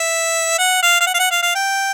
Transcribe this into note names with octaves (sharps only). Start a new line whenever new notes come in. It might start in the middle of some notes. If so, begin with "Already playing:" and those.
Already playing: E5
F#5
F5
F5
F#5
F5
F#5
F5
F5
G5